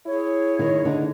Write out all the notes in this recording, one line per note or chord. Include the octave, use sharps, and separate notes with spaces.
E4 G#4 C#5
D#3
D3 D#4